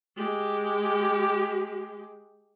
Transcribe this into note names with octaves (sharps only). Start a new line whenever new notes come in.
G#3 G4